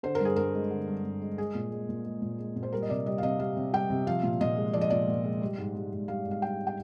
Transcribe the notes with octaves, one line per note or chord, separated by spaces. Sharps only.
D3 C5
A#4
G2 G#4
G2 A#4
G#3
D3
G2
G2
G#3
G#3 G#4
A#2
G#3
A#2
G#3
A#2
G#3
A#2
C5
G3 A#4
D#5
C3 D5
G3 D#5
F5
C3 D#5
G3 F5
C3
G3 G5
C3
F3 F5
A#2
A#2 D#5
G#3
F3 D5
D#5
A#2 D5
A#2
G#3
G3
G#2
G3
G#2
G3 F5
G#2
F5
G3 G5
G5